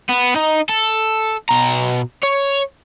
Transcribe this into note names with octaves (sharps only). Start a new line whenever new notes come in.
B3
D#4
A4
B2 A#5
C#5